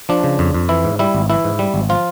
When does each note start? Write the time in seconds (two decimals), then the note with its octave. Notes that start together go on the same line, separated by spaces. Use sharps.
0.09 F3 D4
0.24 C#3
0.39 F2
0.54 F2
0.69 E3 E4
0.84 G#2
0.99 G3 E4
1.15 G#1
1.30 E3 E4
1.44 G#2
1.59 G3
1.74 G#1
1.89 F3 F4